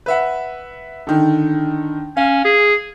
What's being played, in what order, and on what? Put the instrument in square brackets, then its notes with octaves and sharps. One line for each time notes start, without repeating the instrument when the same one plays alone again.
[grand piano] B4 E5 F#5
D3 D#3
[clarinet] C#4 [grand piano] F5
[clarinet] G#4